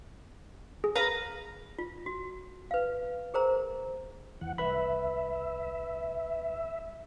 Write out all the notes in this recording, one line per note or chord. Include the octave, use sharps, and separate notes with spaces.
G#4
B4 F5 A#5
F4
F#4
B4 F5
G#4 A#4 C5 A#5
E2 E3 F#5
C2 B4 E5 B5